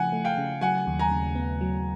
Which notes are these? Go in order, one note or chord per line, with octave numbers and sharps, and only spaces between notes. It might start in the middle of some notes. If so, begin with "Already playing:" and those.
Already playing: C#3 F3 A3 F#5 G#5
A3
F5 G5
C#3
F#3 F#5 G#5
D#2
G#5 A#5
C#3
B3
F#3